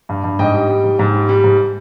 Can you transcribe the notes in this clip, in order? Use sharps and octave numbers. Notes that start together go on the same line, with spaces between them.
G2
G2
G#2 D#5 G5
G3
G3
G#2
G#2
G3
G3
G#2